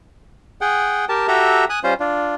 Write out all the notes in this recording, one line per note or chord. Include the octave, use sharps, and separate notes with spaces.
G#4 F#5 G5
G4 A#4 A5
F#4 G4 A4 E5 A#5
G#5 D#6 F#6
G3 C#4 F4 C5
D4 F4